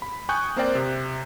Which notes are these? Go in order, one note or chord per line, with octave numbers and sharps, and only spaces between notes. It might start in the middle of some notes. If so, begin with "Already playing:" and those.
B5
G5 G#5 C#6 D#6 F#6 G6
A#3 C4 A#4 C5 D5 G5
C3